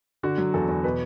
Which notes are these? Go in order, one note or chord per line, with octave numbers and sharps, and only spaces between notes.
D3 F#4
F#3
E2 A4
E2
B2 B4